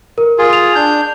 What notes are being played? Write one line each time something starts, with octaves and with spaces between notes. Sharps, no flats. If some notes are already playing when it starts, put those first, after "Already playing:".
A#4
F4 G#4
F7
D4 G6